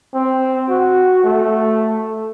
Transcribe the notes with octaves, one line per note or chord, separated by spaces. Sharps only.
C4
F#4
A3